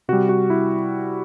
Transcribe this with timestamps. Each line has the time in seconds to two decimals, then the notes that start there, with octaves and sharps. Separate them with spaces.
0.08 C3 G3 F#4
0.29 F#4
0.50 E4